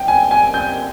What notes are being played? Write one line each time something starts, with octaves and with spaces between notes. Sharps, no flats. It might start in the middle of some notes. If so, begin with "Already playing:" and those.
Already playing: G5
G#5
G#5
G6